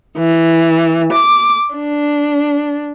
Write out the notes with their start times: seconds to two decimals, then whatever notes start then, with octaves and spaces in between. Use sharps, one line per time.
0.17 E3
1.12 D6
1.75 D4